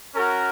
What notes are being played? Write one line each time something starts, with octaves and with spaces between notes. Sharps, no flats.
C#4 F#4 A#4